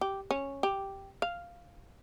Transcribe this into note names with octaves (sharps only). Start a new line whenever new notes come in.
G4
C#4
G4
F5